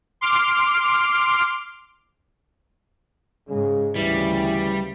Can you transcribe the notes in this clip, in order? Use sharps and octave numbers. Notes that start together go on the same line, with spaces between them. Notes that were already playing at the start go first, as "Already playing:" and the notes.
C6 D6 F6
G#2 C#3 G#3
D2 C#3 E3 G3